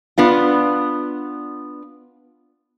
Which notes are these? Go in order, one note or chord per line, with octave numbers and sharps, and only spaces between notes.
B3 D4 F4